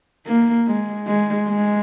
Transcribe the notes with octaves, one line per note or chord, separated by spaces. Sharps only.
A#3
G#3
G#3
G#3